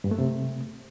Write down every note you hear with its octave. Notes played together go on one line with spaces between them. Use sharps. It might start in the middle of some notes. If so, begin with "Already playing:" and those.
G2
A3
C3